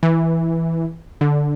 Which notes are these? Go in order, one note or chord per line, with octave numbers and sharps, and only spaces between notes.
E3
D3